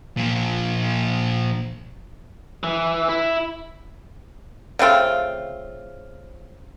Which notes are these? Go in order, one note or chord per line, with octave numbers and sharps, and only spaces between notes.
A#2 F3
E3
E4
C#3 A3 C4 F4